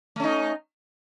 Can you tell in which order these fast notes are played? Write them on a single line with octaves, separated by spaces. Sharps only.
A3 C#4 D#4